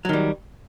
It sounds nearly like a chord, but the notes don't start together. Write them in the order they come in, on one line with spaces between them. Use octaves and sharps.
F#3 D#3 G3